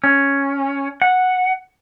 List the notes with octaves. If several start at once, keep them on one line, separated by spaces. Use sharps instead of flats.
C#4
F#5